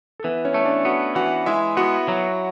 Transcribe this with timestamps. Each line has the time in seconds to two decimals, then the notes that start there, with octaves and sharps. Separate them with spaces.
0.20 A4
0.24 E3 B3 B4
0.45 C#4 C#5
0.54 A3
0.60 C#5
0.65 D4 D5
0.85 B3 F#4 F#5
1.15 E3 F#4 F#5
1.46 G#3 E4 E5
1.77 B3 F#4 F#5
2.08 F#3